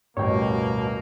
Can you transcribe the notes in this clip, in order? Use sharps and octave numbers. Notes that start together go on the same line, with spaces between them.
A1 D2 G2 B2 A#3 C#5 G5